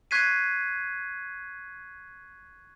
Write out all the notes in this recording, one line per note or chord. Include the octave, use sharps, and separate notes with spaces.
C#6 F#6 G#6 B6 C7 D#7